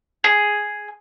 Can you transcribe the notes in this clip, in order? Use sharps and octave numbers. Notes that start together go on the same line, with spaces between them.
G#4